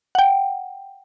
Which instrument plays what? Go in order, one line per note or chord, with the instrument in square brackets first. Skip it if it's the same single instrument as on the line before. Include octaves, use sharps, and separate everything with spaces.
[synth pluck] F#5 G5